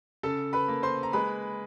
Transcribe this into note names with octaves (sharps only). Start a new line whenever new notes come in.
C#3 A4 A5
B4 B5
A#3
C5 C6
A#5
G#3 B4 B5